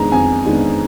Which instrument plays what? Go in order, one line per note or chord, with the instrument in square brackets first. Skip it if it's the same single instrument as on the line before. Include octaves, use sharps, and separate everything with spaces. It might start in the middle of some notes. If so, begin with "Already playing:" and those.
Already playing: [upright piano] F2 D#3 G#3 B3 D4 A#5
F2 G#5
D#3 G#3 B3 D4